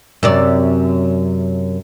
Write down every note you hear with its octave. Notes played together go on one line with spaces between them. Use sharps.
F#2 C3 D5